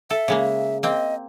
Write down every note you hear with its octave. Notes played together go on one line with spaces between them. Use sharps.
A4 E5
C#3 G#3 A#3
A#3 C4 D#5 G5